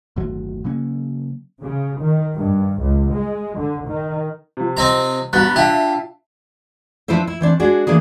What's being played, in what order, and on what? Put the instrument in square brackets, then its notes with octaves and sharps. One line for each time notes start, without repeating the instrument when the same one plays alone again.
[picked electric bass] G1 D#2 A2 F#3
C#3 F#3 A#3 C#4
[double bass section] C#3
D#3
G2
C#2
G#3
D3
D#3
[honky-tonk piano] C3 F3
[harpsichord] C4 D#4 A#5
[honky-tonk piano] G2 F#4 A#5 [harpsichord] B3 [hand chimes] F#6 A6
[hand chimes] D4 F4 A5 [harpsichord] G4 [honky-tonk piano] E5 F5 G5
[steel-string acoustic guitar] F3 D4 E4 B4 C5 E5
E4
E3 C4 D4
G#3 D4 F#4 G#4
E3 A#3 D4 G#4